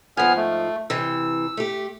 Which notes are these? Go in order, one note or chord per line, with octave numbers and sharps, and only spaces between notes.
G#2 F3 B3 G#5 F6
A3
C3 E3 E6
A3 G4